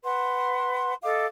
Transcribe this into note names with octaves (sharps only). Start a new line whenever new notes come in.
B4 F#5 C6
A4 D#5 F5 D6